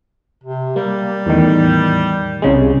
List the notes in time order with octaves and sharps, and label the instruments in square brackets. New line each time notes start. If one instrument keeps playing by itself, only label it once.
[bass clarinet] C3
[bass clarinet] G3 [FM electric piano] A#3
[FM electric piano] E2 A2 D#3
C2 C#3 G#3